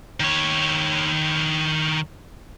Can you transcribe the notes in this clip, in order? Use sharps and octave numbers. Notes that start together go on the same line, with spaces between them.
D#3 C#5